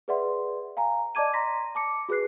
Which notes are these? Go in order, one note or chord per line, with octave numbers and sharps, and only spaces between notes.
G#4 B4 D5 E5 F#5 C6
F5 G#5 A#5
D5 D#5 A5 D6 G#6 D#7
A#5 C6 A#6 B6
A5 D6 C#7
F#4 G#4 B4 F#6 C7